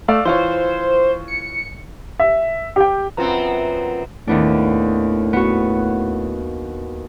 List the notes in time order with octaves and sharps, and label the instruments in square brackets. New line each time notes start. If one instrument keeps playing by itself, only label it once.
[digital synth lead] A3 [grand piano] D5 F5 E6
[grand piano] E3 F4 C#5 [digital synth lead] C5
[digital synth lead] C#7
[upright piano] E5
G4 G5
[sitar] F#2 B3 C4 [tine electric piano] F4 B4 A#5
[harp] D#2 B3 D4 [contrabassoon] A2
[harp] B3 F#4